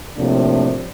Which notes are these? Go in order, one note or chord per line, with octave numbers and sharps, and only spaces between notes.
A2 C3 F3 A#3 D4